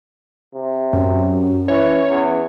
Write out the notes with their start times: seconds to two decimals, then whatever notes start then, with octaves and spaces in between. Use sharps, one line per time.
0.54 C3
0.93 F#2 C#4
1.68 E3 C#5
2.10 E2